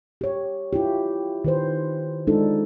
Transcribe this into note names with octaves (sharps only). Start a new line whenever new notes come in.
G4 C#5
E4 F4 G4
D#3 B4 C5
G#3 D4 D#4 F4 A4